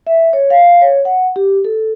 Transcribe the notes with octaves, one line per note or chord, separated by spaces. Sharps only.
E5
C#5
F5
C#5
F#5
G4
A4